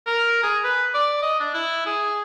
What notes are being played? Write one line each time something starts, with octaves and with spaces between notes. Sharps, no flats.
A#4
G#4
B4
D5
D#5
D4
E4
G#4